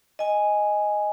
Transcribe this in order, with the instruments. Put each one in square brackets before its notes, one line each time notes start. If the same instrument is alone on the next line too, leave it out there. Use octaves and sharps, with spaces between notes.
[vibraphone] D#5 G#5